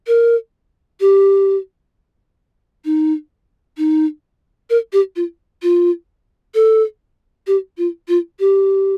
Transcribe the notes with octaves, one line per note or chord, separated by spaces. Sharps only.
A#4
G4
D#4
D#4
A#4
G4
F4
F4
A4
G4
F4
F4
G4